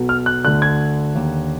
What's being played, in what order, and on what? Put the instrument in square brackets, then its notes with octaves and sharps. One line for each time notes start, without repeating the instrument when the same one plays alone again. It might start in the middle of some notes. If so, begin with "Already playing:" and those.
Already playing: [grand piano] B1 B2
F6
F#6
D2 D3 F#6
G#6
D#2 D3